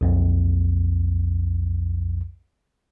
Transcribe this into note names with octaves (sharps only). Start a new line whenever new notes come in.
B1 F2